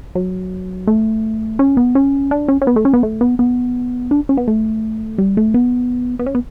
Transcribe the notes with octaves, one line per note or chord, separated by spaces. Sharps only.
F#3
A3
C#4
B3
C#4
D4
C#4
C#4
B3
A3
C#4
B3
A3
B3
B3
D4
C#4
B3
A3
G3
A3
B3
B3
C#4
B3